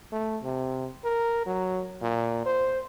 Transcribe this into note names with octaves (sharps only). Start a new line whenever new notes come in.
A3
C3
A#4
F#3
A#2
C5